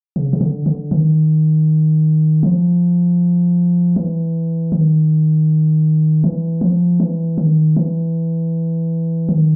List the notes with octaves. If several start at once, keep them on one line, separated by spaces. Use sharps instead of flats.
C#3
C#3
D3
D3
D#3
F3
E3
D#3
E3
F3
E3
D#3
E3
D#3